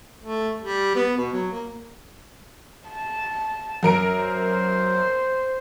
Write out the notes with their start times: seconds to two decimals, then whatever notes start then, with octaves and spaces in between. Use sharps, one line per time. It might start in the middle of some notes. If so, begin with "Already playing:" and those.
0.23 A3
0.59 G3
0.95 B3
1.17 B2
1.33 F#3
1.51 A#3
2.89 A5
3.83 F#2 A#4 D7
4.23 C5